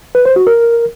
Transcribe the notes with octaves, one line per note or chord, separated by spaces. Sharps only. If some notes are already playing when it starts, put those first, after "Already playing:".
B4
C5
F#4
A#4